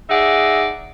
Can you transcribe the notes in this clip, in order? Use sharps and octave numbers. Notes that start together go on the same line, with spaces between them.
D#4 G#4 D5 E5 F#5